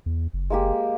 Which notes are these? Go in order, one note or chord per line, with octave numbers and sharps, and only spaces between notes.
E2
F#1
G#3 A#3 G4